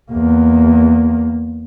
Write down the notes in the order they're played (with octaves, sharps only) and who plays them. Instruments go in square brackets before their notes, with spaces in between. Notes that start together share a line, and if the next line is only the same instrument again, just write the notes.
[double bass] E2 A#3